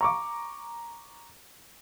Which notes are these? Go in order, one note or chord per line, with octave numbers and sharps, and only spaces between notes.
A#5 C#6 D6